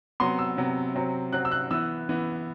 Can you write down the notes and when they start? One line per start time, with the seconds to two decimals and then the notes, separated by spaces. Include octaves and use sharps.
0.20 C3 F#3 B3 C6
0.39 E6
0.57 C3 F#3 B3
0.95 C3 F#3 C4
1.33 C3 F#3 C4 F#6
1.45 E6
1.51 F#6
1.71 E3 B3 E6
2.09 E3 B3